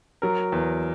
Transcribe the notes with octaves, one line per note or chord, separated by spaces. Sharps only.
F#3 A#4
E2